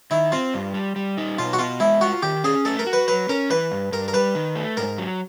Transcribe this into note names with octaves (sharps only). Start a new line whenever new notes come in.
D#3 E4
C4 F4
G2
G3
G3
D#4
B2 F4
F#4
B3 F4
G#3 E4
F4 F#4
D#3 G4
C#4 G#4
A3 A4
A#4
F#4
B4
F#3 B4
C#4 A#4
E3 B4
G2
G2 A#4
A#4
G3 B4
D#3
A3
G#2 A#4
F#3